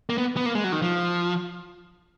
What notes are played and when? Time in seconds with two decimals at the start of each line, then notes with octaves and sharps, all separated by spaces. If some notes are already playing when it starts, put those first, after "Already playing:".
0.09 A#3
0.18 B3
0.37 B3
0.46 A#3
0.55 G#3
0.64 F#3
0.72 D#3
0.82 F3